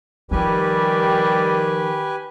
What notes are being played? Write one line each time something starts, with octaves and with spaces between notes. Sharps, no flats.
D#3 F3 G3 G4 B4 G#5